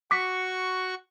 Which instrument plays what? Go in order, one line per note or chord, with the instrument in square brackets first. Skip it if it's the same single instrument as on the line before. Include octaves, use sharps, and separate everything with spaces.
[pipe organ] F#4 C#6 [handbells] D6 B6